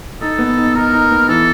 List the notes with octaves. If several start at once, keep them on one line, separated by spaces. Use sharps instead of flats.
D#4 A4
B3
D#4
D#4 A#4
D#4
B3
E3 A4